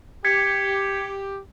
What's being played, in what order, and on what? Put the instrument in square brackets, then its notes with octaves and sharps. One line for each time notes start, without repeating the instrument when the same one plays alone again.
[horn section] G4 [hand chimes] G#6 B6 C#7